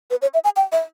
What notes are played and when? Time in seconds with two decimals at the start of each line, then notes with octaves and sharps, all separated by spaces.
0.11 B4
0.22 C#5
0.34 E5
0.44 G#5
0.56 G5
0.72 E5